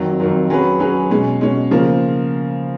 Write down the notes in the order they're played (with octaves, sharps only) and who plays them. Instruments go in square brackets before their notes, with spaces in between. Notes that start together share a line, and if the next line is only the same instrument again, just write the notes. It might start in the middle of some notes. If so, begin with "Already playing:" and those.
Already playing: [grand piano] F2 D#3 F#3
F2 D#3 F#3
F#3 C#4 G#4 B4
F#3 C#4 G#4 B4
B2 G#3 C#4
B2 G#3 C#4
C#3 F3 A#3